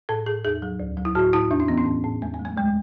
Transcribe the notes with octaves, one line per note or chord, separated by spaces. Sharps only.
A2 A4
A2 G#4
E2 G#4
F#3
D2
F#3
E4
A2 F#4
A2 E4
E2 D4
C#4
E3 B3
C#4
A2
A2
E2 A3
A3
F#3
A3
D2 G#3